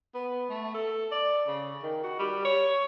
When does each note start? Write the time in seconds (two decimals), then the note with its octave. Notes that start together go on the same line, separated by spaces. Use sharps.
0.15 B3
0.50 A3
0.74 A4
1.12 D5
1.48 C#3
1.83 D#3
2.04 F#4
2.19 G3
2.45 C#5